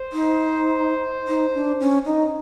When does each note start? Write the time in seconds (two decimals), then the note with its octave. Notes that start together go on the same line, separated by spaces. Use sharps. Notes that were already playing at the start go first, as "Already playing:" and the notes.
Already playing: C5
0.13 D#4
1.28 D#4
1.54 D4
1.80 C#4
2.05 D#4